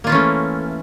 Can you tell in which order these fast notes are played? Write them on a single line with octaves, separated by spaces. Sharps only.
A#3 F4 E3 C#4 A3